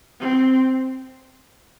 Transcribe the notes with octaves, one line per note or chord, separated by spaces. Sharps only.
C4